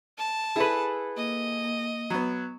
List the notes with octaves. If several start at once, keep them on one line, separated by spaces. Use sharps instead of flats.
A5
E4 G#4 A4 B4 B5
A#3 D#5
F#3 B3